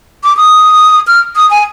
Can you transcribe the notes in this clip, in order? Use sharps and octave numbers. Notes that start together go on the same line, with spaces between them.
D6
D#6
F6
D#6
G#5